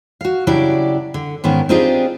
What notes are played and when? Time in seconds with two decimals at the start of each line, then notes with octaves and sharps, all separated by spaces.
0.21 F#4 F5
0.47 C#3 F#3 D4 E4 G4 D5
1.14 D3
1.44 G#2 D#3 B3 C#4 A#4
1.69 C4 D4 D#4 F4 G4 G#4